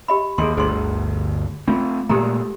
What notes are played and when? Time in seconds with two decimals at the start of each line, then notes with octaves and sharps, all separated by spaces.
0.08 G4 D#5 B5
0.38 D#2 G#4 D#5 C6
0.57 G1 D2 G#4 C6
1.68 A3 C4 F4
2.09 A#2 G#3 A3 G4 A4 A#5